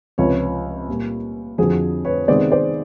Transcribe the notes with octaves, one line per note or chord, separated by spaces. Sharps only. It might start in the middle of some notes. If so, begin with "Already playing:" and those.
C#2 C3 F3 B4 C#5
A#2 G3 A#3
F2 D3 F3 F#4 G#4
B4 C#5
C3 D#3 G#3 B3 C5 D5
C5 D5